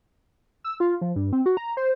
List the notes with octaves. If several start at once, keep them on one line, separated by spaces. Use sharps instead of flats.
E6
F4
F3
G2
C4
F#4
A#5
C5